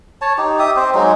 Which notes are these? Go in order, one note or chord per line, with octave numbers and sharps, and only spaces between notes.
C#5 A5
D#4 G4
G4 E5 D#6
C4 C5
F#3 G#3 D#4